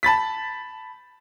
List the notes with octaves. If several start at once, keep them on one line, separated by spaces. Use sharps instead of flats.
A5 B5 A6 B6